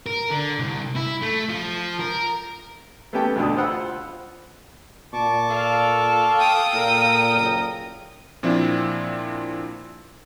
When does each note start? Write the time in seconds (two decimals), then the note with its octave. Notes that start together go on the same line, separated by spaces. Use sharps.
0.06 A#4
0.31 D3
0.60 C2
0.96 E4
1.22 A3
1.49 F3
2.01 A#4
3.13 A3 B3 C#4 G4 G5 A5
3.36 D2 B2 D3 D#6
3.56 F4 C5 F#5 B5 E6
5.13 A#2 A5 C#6 D6
5.50 A4 F5
6.38 G5 D#6
6.74 A#2 A#4
7.37 F#1
8.43 A#2 F3 C4 D4 E4 F4